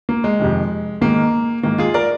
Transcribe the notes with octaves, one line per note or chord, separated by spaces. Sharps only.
A#3
G#3
F2 C3 D#3
G#2 D#3 A#3
G#2 D#3 A#3
F4 G#4
A#4 D5